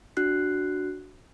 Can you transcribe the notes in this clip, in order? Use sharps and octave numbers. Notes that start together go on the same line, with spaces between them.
D4 F#4 F#6 C7